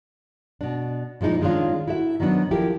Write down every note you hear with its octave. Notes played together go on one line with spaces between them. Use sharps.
B2 D4
A#2 F3 G#3 D#4 E4
D#3 G#3 C#4 D4 F4
E4 F#4 A4 E5
D#3 F#3 B3 D4
F3 E4 G4 A4 A#4